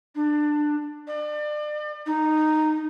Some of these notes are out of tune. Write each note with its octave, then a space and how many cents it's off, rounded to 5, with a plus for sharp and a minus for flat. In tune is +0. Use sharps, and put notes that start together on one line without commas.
D4 +20
D5 +35
D#4 -10